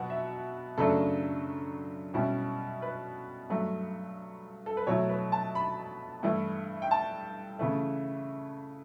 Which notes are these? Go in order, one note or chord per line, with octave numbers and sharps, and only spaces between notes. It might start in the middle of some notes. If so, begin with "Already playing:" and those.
Already playing: B2 F#3 B3 F#5
E5
F#2 C#3 F#3 A3 D4 A4
B2 G3 C#4 E4
B4
G2 F#3 A3
A4
B4
B2 F#3 A3 E4 C#5
B4
A5
B5
G2 E3 A3 E4
G5
A5
C#3 E3 A3